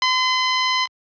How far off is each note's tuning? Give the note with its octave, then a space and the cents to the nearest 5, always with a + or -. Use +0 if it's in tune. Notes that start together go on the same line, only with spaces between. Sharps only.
C6 -40